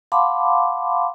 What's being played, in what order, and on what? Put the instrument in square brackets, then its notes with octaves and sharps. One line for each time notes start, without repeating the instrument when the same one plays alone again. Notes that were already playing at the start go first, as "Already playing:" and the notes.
[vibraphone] F5 F#5 A5 B5 C6 D6